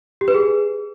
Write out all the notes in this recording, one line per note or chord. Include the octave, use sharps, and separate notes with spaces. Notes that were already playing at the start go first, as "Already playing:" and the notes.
G4
B4
G#4